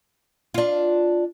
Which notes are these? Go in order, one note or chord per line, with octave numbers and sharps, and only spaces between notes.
D4 F4